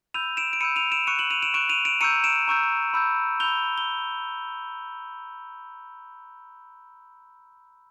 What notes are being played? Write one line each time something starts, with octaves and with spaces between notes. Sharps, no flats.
B5 E6 G6 D#7 F7
D7 E7
D7
B5 E6 G6 C#7 D#7
D#7 F7
D7 E7
C#6 F#6 C#7 D#7
E7 F#7
D#7 F7
D7 E7
C#6 F#6 D7 E7
D#7 F7
D7 E7
A#5 C#6 E6 G6 C#7 D#7
D7 E7
A#5 C#6 E6 G6
B5 E6 G6
B5 E6 G6 F7 G7
G7